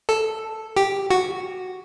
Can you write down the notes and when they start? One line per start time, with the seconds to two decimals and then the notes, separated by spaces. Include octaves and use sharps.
0.09 A4
0.77 G4
1.10 F#4